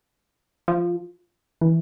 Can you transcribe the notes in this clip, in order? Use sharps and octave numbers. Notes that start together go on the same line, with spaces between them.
F3
E3